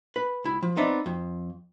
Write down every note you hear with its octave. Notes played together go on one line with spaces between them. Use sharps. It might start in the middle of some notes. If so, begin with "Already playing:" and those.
B4
C#2 E4
F3
B3 C4 D#4 D5 E5 A5
F2